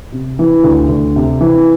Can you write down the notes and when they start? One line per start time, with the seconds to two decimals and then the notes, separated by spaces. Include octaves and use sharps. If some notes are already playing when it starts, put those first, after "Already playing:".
0.12 C3
0.39 E3
0.64 D2
0.89 D2
1.16 C3
1.41 E3